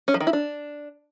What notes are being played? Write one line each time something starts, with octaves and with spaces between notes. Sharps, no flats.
C#4
F3
D#3
E4
D4